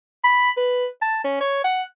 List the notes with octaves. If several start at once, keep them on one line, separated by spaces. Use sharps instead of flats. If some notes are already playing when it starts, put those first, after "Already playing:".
B5
B4
A5
C#4
C#5
F#5